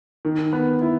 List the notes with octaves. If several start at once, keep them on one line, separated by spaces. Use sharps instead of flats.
D#3
B3
E4